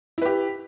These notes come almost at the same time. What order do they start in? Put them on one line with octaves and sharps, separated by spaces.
E4 B4 G4